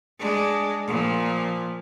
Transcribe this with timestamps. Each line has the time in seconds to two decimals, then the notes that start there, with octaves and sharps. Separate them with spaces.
0.19 G#3 D4
0.87 A#2 F3